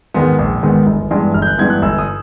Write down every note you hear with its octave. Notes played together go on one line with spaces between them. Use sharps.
G#2 D#3 G#3 B3
A#1
G#2 D#3 G#3 B3
G1
G2 E3 G#3 B3
G1 F6
G6
F#6
G2 E3 G#3 B3 G#6
F#6
G1 E6
D#6